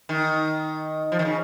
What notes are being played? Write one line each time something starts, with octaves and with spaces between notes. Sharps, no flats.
D#3
F3
D#3
C#3